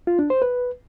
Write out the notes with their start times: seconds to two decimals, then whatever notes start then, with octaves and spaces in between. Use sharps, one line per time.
0.07 F4
0.19 D4
0.30 C5
0.42 B4